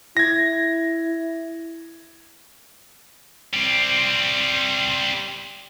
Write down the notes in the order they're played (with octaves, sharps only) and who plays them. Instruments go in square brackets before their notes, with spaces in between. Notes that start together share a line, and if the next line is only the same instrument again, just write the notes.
[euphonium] E4 [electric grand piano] G#6 A#6
[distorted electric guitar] G3 C4